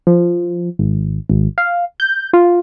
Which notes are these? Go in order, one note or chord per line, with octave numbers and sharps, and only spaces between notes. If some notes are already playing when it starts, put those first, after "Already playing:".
F3
G#1
G#1
F5
G6
F4